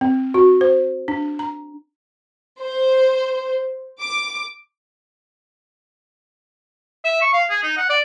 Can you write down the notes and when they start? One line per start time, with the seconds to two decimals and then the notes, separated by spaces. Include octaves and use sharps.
0.01 C4
0.34 F#4
0.61 C5
1.08 D4
1.39 A#5
2.61 C5
3.99 D6
7.04 E5
7.22 C#6
7.33 F5
7.50 G#4
7.63 D#4
7.77 F#5
7.90 D5